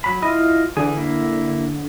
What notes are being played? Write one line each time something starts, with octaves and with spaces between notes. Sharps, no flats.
F#3 B5
E4 F4 D#5
D3 E3 G#4
A#3 E4